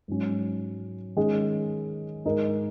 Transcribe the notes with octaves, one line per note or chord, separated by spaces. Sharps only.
G#2 F#3 C#4
D#3 G#3 C#4 G#4
G#2 G#3 D#4 A#4